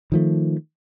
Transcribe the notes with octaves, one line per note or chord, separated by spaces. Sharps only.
D#3 F3 A3